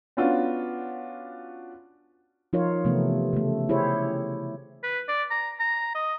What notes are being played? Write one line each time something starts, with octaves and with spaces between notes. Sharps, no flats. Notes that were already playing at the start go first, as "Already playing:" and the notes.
B3 C#4 D4 F4 F#4
F3 D#4 F4 A#4 C#5
C3 E3 A3 B3
C#3 A3
E4 G4 G#4 C5 C#5
B4
D5
A#5
A#5
D#5